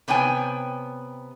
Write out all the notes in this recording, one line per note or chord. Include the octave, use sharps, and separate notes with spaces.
C3 B3 C#5 G5 G#5